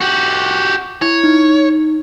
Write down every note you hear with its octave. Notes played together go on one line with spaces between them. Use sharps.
F#4 G4
E4 C#5
D#4